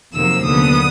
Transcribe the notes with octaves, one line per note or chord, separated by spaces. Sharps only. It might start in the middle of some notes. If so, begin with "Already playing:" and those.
F2 C3 D#3 F#3 A#3 E6
D#2 D3 F#3 B3 D#6